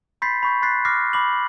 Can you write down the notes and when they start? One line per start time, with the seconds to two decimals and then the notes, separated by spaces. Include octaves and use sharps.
0.22 B5 C6 G6 A6 B6 C7
0.43 B5 C#6 G6
0.62 C6 F#6 A6 B6 C7
0.85 D6 F6 F#6 A#6 C7
1.13 B5 D6 F#7